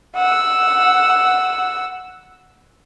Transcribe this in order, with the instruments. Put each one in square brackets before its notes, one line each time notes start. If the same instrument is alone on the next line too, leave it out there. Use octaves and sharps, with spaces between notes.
[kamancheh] F#5 E6